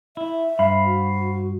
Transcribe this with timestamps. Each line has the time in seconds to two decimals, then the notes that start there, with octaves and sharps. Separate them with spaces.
0.17 E4 E5
0.59 G2 C5 F5 B5
0.86 F#4